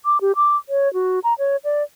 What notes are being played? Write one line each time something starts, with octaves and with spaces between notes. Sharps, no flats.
D6
G4
D6
C#5
F#4
A#5
C#5
D5